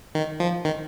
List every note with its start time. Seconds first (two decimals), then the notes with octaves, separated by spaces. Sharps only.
0.15 D#3
0.40 F3
0.65 D#3